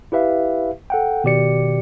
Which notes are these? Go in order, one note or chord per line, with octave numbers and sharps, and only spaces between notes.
E4 G4 B4 E5 F5
A4 F#5 G5
B2 D#3 G4 D5 C#7